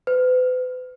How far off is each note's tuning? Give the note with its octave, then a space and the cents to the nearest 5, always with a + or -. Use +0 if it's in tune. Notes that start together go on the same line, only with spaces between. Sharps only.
B4 +40